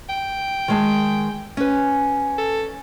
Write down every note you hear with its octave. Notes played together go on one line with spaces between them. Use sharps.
G5
D#3 G#3 A5
C#4 B4
A4